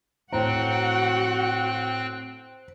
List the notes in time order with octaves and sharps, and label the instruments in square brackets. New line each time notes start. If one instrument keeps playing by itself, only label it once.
[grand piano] A2 A#5 [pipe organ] C4 G5 F#6 [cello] F#4 F#5 [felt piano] C5